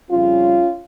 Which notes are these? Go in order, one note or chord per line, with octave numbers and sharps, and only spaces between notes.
F2 C#3 G3 C#4 F4